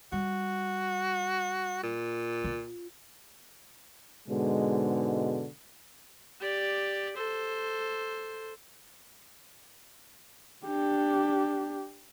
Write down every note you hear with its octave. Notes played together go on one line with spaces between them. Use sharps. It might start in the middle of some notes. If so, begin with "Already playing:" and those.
G3 F#4
A#2
F4
G#2 B2 D3 G#3
G4 D5
A4 C5
D4 G4